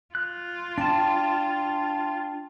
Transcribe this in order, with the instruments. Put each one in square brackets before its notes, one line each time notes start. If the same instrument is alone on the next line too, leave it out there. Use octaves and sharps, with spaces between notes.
[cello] F4 [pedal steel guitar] F#6
[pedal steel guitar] D4 A5 [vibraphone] G5 C6